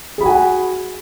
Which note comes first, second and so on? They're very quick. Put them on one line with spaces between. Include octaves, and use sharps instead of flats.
G#4 B5 F#4 G#5 F#5